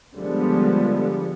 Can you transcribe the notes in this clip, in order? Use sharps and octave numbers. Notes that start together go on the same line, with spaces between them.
D3 F3 G3 G#3 B3